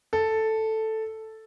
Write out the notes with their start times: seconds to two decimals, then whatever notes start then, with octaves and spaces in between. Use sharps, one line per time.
0.13 A4